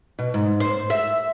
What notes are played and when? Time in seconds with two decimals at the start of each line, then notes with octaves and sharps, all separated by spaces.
0.19 B2
0.34 G#2
0.60 C5
0.90 E5